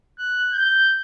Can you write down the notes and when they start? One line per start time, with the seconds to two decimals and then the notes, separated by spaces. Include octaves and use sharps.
0.18 F#6
0.53 G6